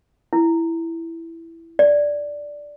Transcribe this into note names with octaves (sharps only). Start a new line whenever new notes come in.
E4
D5